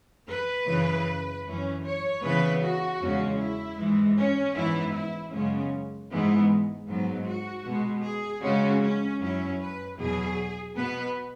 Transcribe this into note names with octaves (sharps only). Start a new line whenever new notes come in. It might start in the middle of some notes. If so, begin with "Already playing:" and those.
B4
F#2 C#3 E3
F#2 E3 C#4
C#5
C#3 E3 B3 B4
F#4
E2 C#3 G#3 C#4
E4
G#2 E3 G#3
C#4
G#2 E3 B3 E4
E4
F#2 C#3 G#3 B3 C#4
G#2 E3 G#3 B3
G#2 F#3 B3
F#4
B2 G#3 B3
G#4
C#3 G#3 C#4 F#4
C#4
F#2 F#3 C#4 E4
B4
E2 B2 F#3 G#4
B2 B3 B4